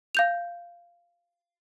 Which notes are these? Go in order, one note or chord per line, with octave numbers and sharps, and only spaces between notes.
F5 G6 F7